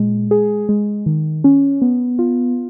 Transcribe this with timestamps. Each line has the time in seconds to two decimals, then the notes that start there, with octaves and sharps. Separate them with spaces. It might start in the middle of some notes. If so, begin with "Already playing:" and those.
Already playing: A#2 G#3
0.31 G#4
0.69 G#3
1.06 D#3
1.44 C#4
1.82 B3
2.19 F4